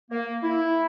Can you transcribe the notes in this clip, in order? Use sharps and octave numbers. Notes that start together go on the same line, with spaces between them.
A#3
E4